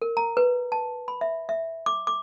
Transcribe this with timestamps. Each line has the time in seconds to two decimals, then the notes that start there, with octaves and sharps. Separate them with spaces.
0.02 A#4
0.17 A#5
0.37 B4
0.72 A5
1.08 B5
1.21 E5
1.49 E5
1.86 D6
2.07 D6